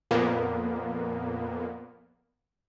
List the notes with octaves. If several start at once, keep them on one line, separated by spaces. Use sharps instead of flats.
F2 A#2 A#3 B3